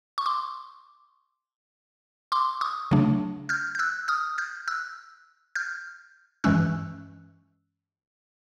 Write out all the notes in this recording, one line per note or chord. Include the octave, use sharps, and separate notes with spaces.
C#6
C6 D6
C6 D6
C#6 D#6
C#3 F#3 A3 D4
F6 G6
G6
E6 F#6
D#6 F6
F6 G6
E6 F#6
F6 G6
G2 E3 G#3 C#4 E6 F#6